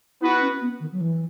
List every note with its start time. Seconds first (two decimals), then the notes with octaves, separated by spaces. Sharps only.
0.21 B3 E4 F#4 B4
0.40 C#4
0.61 B3
0.80 D#3
0.91 F#3
1.00 E3